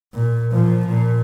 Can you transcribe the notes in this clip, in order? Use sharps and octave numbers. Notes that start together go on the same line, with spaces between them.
A#2
A#2 F3
A#2